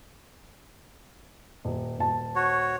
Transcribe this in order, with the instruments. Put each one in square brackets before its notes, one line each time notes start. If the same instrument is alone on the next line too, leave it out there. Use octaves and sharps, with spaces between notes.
[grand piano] D#1
D#1 A5
[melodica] F#4 C#5